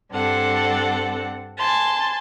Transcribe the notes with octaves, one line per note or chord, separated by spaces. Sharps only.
G2 C4 D4 A4 F#5
G#5 A5 C6